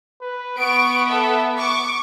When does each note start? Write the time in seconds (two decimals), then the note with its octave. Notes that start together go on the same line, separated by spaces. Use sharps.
0.22 B4
0.58 B3 C#6 D7
1.06 A4 E5
1.57 C#6 D6